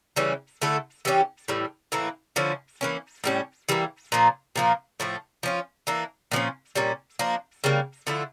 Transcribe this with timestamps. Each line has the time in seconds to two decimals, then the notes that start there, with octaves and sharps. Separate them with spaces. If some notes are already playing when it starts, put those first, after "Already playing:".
0.16 C#3 E3 G3 C#4
0.61 D3 A3 E4 A4
1.05 E3 G3 C#4 G4
1.48 A2 E3 G3
1.92 A2 E3 A#3 E4
2.36 D3 F3 C#4 E4
2.81 E3 A#3 C#4
3.24 A2 G3 C#4
3.69 E3 G3 A#3
4.12 A#2 F3 A#3
4.56 A#2 F3 A#3
5.00 A2 F3 A3
5.43 F3 C#4 F4
5.87 E3 A#3 D4
6.32 A#2 F3 A#3 C#4
6.75 A#2 G3 C#4
7.19 F3 A#3 D4
7.64 C#3 G3 A#3
8.07 D3 F3 A3 E4